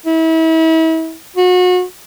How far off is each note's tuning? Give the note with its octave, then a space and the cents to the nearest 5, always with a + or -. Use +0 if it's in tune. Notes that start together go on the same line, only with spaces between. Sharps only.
E4 -35
F#4 -30